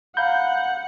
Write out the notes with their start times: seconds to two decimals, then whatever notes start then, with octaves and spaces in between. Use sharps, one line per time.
0.17 F5 F#5 A#5 B5 G6